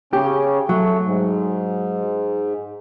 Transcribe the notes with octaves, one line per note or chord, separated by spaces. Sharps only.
C#3 C#4 G4
F#3 A3
G#2